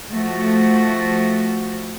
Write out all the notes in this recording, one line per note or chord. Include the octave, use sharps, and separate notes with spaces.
F3 A3 F#4